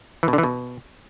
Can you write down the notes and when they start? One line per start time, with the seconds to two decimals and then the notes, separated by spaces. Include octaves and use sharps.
0.23 E3
0.28 B2
0.33 D3
0.38 E3
0.43 B2